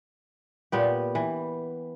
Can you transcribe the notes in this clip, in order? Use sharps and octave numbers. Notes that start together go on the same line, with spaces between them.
A#2 B3 G4
E3